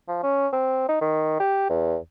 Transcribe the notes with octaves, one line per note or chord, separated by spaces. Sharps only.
F3
C#4
C4
D#4
D#3
G4
E2